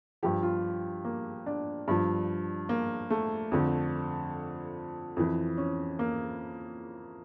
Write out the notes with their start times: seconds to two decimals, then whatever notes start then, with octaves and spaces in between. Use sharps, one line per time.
0.23 G2 F3 G4
0.43 F4
1.05 A#3
1.46 D4
1.88 G2 F3
2.69 A#3
3.10 A3
3.52 F2 D3 F3
5.17 F2 E3
5.58 C#4
5.99 A#3